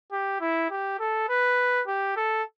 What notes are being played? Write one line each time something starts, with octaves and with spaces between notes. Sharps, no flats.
G4
E4
G4
A4
B4
G4
A4